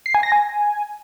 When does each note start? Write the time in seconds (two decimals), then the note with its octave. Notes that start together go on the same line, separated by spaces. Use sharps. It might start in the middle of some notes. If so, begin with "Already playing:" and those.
0.06 C7
0.14 G#5
0.23 A#6
0.32 G#5